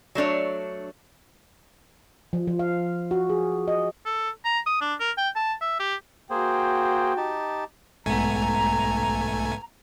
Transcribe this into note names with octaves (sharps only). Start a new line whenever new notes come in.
F#3 A3 D4 C#5
F3
F3
F5
F#4
G#4
D#5
A4
A#5
D#6
D4
A#4
G5
A5
E5
G4
A#3 F#4 G#4 C5 G5
D#4 G4 A5
B1 G#2 A3 B3 G#5 A#5